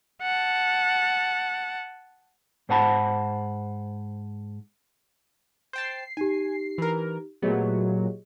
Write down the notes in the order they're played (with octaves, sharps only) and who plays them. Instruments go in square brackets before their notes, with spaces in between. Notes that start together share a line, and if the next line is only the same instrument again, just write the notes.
[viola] F#5 A5
[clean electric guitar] G#2 C5 F#5 A5 B5
[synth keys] C5 G5 A5 [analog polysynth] C7
[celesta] D#4 G4 [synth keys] G#5
[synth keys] E3 A#4
[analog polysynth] A#2 F#3 [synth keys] A3 B3 [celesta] G4 G#4 D#5